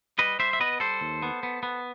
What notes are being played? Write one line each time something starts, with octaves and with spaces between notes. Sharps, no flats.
G3 B4 D#5
G3 C5 E5
E5
B3 B4 D#5
G3 A4 C5
D#2
B3
B3
B3